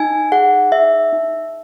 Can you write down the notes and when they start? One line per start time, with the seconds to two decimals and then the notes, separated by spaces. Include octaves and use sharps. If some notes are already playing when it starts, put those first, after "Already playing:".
Already playing: D#4 G#5
0.32 G#4 F#5
0.72 D#4 E5
1.13 D#4